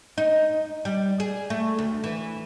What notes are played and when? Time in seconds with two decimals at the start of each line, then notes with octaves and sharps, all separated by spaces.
0.18 D#4
0.85 G3
1.20 G#4
1.50 A3
1.79 D2
2.04 E3